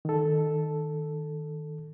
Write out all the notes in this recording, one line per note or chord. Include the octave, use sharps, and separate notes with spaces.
D#3 A4